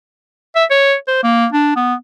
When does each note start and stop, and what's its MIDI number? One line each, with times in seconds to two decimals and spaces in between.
0.56 0.65 76
0.71 0.95 73
1.07 1.19 72
1.23 1.46 58
1.53 1.73 62
1.76 1.95 59